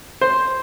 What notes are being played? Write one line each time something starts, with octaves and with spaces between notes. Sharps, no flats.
C5